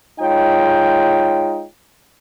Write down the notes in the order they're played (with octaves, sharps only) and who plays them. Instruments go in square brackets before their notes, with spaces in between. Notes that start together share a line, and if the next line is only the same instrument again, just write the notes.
[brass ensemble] G#3 D#4 F4 C#5 G5